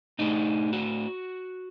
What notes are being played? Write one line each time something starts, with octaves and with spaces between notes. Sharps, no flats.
A2 A3 D4 D#4
F#4